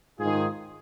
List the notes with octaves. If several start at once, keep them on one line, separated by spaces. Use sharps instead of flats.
G#2 D#3 F4 G#4